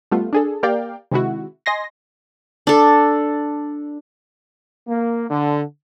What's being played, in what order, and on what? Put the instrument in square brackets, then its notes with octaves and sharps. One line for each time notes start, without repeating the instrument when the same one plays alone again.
[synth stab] G3 A3 B3 F4
D4 G#4 A4
A#3 G4 A#4 D5 F5 G5
C3 D#3 G#3 E4 F#4
D#5 G#5 C6 A#6
[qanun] D4 A4
[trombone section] A#3
D3